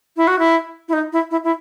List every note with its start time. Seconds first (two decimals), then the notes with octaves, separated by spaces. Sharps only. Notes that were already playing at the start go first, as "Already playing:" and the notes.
0.17 E4
0.27 F#4
0.39 E4
0.88 E4
0.93 D#4
1.13 E4
1.31 E4
1.44 E4